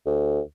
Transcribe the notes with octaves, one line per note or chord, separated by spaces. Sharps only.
D2